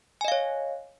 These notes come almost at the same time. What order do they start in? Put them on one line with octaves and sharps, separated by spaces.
G#5 D#5 F5 C#5